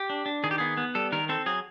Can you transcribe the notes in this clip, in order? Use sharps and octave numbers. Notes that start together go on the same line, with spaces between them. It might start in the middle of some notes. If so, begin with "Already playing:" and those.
Already playing: G4
D4
D4
D#3 G#4
G4
B3 G#4
B3
G3 A4
D#3 A#4
C4 A4
F#3 G#4